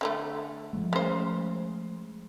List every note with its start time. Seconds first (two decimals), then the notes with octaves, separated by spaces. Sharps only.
0.01 D3 F3 A3
0.73 F3 G#3 A3
0.93 C#3 C5